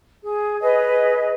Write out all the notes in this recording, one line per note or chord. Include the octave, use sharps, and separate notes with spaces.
G#4
G#4 B4 C#5 D#5